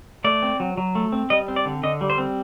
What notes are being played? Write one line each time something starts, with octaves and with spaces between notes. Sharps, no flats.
A3 D5
C4
F#3
F#3
A3
C4
G3 D#5
C4
D5
D3
D3 D#5
G3
C5
C4